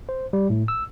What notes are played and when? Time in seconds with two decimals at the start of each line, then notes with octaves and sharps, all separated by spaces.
0.09 C5
0.33 G3
0.50 A2
0.68 E6